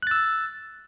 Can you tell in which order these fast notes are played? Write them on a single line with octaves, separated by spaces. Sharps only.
F#6 A6 E6